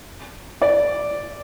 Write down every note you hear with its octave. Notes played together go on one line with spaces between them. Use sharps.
D5